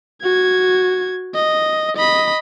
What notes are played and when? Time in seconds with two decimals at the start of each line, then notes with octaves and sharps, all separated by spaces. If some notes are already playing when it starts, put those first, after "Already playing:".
0.23 F#4 G#6
1.35 D#5
1.97 D#5 B5